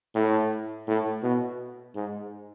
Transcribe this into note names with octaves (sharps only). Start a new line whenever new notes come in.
A2
A2
B2
G#2